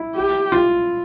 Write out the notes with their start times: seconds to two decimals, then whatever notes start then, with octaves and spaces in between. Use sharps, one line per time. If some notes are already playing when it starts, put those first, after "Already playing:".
Already playing: E4
0.15 G4
0.52 F4